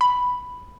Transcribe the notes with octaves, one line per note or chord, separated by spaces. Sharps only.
B5